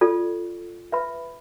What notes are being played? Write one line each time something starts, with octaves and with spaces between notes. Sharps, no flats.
F4 A4 D5
B4 E5 B5